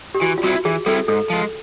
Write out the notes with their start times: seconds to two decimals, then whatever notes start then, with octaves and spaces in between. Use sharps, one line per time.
0.15 G4
0.21 E3 F#4
0.38 F4
0.43 G3 C4 E4 F#4
0.65 E3 G#4
0.86 G3 C4 E4 A4
1.08 G#2 A4
1.30 F3 G#3